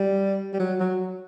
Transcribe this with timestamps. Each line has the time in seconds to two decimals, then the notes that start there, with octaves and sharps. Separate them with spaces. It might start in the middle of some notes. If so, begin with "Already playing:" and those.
Already playing: G3
0.53 G3
0.60 F#3
0.80 F#3